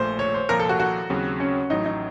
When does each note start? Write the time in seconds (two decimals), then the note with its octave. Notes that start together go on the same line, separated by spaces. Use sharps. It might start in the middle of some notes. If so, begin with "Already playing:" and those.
Already playing: A#1 A#2 A3 C5
0.19 C#5
0.34 C5
0.49 C2 A#2 F3 A#4
0.59 A4
0.69 F#4
0.80 F#4
1.10 D#2 C#3 F#3 C4
1.40 C#4
1.70 A1 A2 F#3 D#4
1.85 D#4